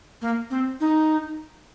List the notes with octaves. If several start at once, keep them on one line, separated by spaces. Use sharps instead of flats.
A#3
C4
D#4